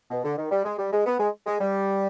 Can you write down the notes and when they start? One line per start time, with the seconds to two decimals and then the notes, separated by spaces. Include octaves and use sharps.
0.11 B2
0.24 D3
0.38 D#3
0.51 G3
0.65 G#3
0.79 G3
0.93 G#3
1.06 B3
1.20 G#3
1.47 G#3
1.61 G3